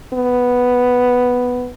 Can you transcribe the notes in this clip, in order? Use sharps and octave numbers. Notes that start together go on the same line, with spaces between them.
B3